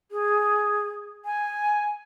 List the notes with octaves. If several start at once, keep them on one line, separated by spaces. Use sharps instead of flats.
G#4
G#5